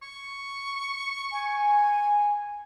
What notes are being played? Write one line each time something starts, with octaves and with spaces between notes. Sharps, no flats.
C#6
G#5